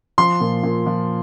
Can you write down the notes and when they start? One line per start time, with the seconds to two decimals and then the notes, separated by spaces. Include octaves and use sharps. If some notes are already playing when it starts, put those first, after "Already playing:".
0.18 F3 C6
0.41 A#2
0.63 A#2
0.86 F3